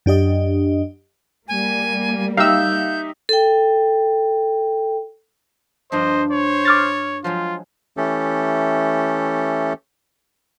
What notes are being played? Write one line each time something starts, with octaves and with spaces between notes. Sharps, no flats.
F#2 D4 G4 D#5
G3 A#3 G#5
D#4 G4 E5 F5 E6 G6
A4 G5
G2 F3 D4 C5 D#5
C5 C#5
D6 F6 A6
F3 F#3 G#3 F4
E3 A3 C#4 G4 A4